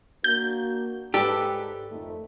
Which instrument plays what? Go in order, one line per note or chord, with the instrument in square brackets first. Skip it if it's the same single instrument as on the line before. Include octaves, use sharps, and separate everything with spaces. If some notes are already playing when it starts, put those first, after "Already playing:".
[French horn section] A#3 D4 F#4 [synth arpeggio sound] G6
[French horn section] G#2 [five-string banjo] D4 A4 B4 [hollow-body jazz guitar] G4
[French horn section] F2 D#3 A3